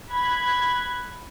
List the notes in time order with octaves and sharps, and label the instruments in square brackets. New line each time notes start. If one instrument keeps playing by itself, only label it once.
[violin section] B5 F#6 G#6